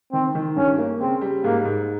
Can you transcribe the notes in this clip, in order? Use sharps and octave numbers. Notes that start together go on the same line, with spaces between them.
D#3 C4
D#3
G2 C#4
A#3
C#3 C4
G3
G#2 A#3
G#2